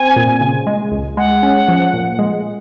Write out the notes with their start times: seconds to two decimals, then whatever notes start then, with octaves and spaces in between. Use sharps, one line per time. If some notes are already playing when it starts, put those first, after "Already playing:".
Already playing: C4 G#5
0.16 A#2
0.41 C#3
0.67 G#3
0.91 C#2
1.17 G#3 F#5
1.43 C#4
1.68 F3
1.93 A#2
2.19 G#3